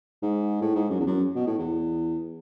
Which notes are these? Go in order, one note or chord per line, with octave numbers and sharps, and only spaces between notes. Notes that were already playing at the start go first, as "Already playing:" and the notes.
G#2
A2
G#2
F#2
E2
F#2
B2
A2
E2